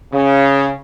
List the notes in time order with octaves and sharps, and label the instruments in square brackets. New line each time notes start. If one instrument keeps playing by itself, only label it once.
[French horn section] C#3